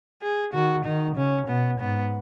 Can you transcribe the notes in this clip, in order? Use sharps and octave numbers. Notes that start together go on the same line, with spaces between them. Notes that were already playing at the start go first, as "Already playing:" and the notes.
G#4
D#3 F#4
D#3 D#4
C#3 C#4
B2 B3
G#2 B3